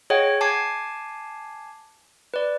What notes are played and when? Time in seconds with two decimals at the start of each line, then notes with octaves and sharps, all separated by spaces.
0.10 G#4 C#5 D#5 F#5 G5
0.41 G#5 A5 D6 G#6 C7
2.34 B4 D5